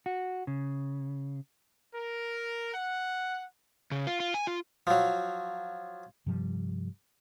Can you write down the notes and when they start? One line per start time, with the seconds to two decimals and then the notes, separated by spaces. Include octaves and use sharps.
0.06 F#4
0.47 C#3
1.93 A#4
2.74 F#5
3.91 C#3
4.07 F4
4.20 F4
4.34 G#5
4.47 F4
4.87 F3 F#3
6.26 G2 C3 F3 G3